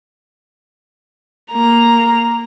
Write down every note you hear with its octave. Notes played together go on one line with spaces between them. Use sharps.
A#3 A#5